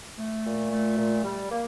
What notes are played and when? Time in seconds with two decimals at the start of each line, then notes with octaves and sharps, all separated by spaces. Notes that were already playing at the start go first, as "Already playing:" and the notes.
0.18 A3
0.44 A#2
0.70 A3
0.97 A#2
1.23 G3
1.49 A#3